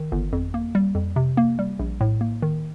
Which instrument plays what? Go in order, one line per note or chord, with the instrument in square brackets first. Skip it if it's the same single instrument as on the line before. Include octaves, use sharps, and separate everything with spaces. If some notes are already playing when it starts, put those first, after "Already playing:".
Already playing: [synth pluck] D#3
G1
F2
A#3
G3
F2
C3
A#3
G3
A#1
A2
A#3
D#3